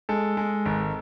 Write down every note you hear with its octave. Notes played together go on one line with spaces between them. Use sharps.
G#3 A4
G#3
G#1